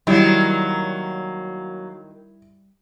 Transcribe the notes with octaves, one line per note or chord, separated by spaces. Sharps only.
D#3 F#3 G3 A#3 E4